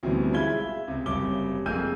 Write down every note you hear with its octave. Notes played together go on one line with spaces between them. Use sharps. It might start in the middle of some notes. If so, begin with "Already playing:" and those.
D2 B2 E3 G3 C4 C#4
G#3 E4 F4 B5 G#6 G7
E5
C#2 C3
F#1 C3 G3 C#5 D6 G7
F2 A#3 G#4 E6 G6 D#7